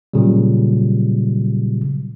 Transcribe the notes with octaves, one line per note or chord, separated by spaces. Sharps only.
A#2 C#3 F#3 G3